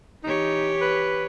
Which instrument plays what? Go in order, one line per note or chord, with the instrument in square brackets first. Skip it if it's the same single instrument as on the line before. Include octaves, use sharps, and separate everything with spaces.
[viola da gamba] E3 G4 C#5 [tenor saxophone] D#4
[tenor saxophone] B4